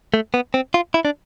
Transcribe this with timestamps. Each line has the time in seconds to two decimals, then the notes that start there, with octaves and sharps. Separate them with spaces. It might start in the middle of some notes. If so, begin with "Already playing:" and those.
0.14 A3
0.34 B3
0.54 C4
0.74 F4
0.94 E4
1.05 D4